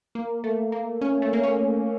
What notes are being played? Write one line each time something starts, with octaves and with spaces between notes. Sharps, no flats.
A#3
A3
A#3
C#4
A3
A#3
C#4